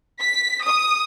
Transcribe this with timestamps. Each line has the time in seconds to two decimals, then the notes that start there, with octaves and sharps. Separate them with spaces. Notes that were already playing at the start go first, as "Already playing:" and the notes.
0.21 B6
0.64 D#6